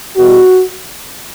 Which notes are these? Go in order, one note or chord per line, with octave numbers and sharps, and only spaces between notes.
E2 B2 G3 F#4